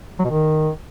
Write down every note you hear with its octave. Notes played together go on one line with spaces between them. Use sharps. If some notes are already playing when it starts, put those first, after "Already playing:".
F#3
B2
D#3